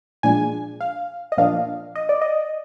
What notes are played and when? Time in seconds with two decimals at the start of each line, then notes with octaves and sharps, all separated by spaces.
0.23 A#2 F3 G#3 D4 G#5
0.81 F5
1.32 D#5
1.38 A#2 F3 A#3 D4 F5
1.95 D#5
2.09 D5
2.22 D#5